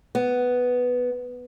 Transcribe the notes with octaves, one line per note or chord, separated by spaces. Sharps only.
B3